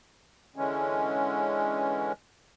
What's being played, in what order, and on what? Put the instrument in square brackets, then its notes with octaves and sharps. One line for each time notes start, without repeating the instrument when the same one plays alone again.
[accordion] D3 E3 G#3 C#4